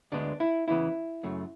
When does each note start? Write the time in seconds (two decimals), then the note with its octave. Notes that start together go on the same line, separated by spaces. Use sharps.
0.12 D2 D3 G#3 B3 D4
0.40 E4
0.68 E2 C#3 E3 B3 E4
1.23 F#2 C#3 F#3 A3